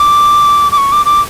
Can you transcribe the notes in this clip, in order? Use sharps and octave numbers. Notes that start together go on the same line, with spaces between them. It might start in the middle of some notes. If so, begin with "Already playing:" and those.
Already playing: D6
D6
C#6
D6
D6